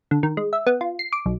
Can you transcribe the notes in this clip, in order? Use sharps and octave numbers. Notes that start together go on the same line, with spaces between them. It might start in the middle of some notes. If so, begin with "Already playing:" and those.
D3
D#3
G#3
E5
B3
F4
C7
D6
B1